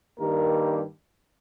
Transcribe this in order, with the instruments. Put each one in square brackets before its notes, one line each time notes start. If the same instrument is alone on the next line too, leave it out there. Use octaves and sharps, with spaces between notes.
[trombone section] G2 D#3 G3 A#3 A#4